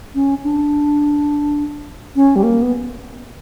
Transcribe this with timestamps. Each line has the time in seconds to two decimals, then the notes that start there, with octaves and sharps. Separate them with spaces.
0.15 C#4
0.44 D4
2.16 C#4
2.36 G3
2.43 A#3
2.62 B3